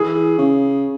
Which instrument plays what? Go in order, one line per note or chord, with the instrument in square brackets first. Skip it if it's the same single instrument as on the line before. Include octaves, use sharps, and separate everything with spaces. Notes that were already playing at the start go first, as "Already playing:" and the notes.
Already playing: [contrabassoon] E3 [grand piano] G#4
[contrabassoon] C#3